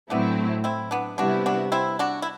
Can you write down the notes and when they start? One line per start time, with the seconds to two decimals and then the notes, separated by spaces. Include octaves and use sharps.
0.10 A2 F#3 A3 B3 C4 D4 E4
0.64 C4 E4
0.91 B3 D4
1.18 C3 G3 B3 D4 E4 F#4
1.46 D4 F#4
1.72 C4 E4
1.99 D4 F#4
2.22 E4